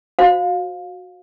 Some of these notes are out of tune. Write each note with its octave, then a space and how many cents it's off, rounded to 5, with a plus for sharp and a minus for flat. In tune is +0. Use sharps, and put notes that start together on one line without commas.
F#4 -15 C5 +0 F5 +20